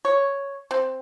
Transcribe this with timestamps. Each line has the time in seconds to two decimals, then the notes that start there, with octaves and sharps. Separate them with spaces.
0.05 C#5
0.71 C4